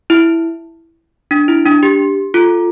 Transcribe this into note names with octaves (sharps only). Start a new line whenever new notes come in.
E4
D4
E4
D4
G4
F4 A4